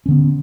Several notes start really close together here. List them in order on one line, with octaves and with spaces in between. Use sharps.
C#4 D3 B3